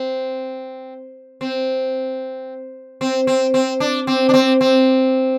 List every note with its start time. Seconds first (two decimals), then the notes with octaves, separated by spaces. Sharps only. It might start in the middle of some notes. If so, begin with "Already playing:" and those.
Already playing: C4
1.41 C4
3.01 C4
3.27 C4
3.54 C4
3.80 D4
4.07 C4
4.29 D4
4.34 C4
4.61 C4